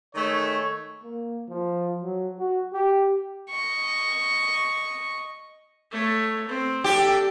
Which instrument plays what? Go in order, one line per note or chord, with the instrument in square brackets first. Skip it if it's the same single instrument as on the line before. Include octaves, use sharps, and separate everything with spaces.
[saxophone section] D#3 G#3 A3 [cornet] C#5
[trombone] A#3
F3
F#3
F#4
G4
[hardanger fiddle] D#5 C#6
[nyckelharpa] A3 C#5
C4
[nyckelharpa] D4 A4 [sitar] G4